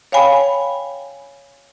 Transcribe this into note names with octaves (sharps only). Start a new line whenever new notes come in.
C#5 F5 G5 G#5 B5